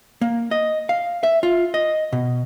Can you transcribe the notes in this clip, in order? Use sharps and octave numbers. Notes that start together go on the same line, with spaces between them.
A#3
D#5
F5
E5
F4
D#5
B2